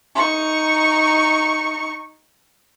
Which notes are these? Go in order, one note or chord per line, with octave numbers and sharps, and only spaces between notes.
D#4 C#6